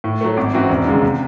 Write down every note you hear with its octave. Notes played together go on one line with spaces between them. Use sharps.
A2
F#3 A3
G#1
F#2 E3 C4 F#4
E1
D#2 C#3 G#3
C3